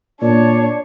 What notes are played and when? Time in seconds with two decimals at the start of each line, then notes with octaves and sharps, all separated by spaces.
0.21 A#2 D4 C#5 D5